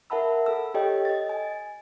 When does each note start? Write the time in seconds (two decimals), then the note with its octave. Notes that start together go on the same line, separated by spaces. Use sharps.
0.10 A#4 E5 F#5 A5 B5 E6
0.46 A4 E6
0.74 G4 A4 C#5 D#5 G5
1.05 D#5 A6
1.29 G#5